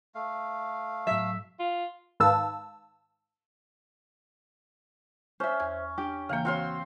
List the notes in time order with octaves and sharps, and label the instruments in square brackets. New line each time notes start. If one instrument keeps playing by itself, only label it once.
[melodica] A3 F5
[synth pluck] A2 F#3 [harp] E5 B6
[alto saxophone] F4
[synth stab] G#2 D#3 B4 F5 A5 E6
[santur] C#4 [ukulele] C5 E5
[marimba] E2 G#6
[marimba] D4 [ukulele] G4
[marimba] C#3 E3 A#3 [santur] F5 G5
[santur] C4 F5 C6 [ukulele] F#4 C#5